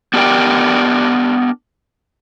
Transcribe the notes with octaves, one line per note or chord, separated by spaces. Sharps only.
B3 D4 G4 A#4 D5 G5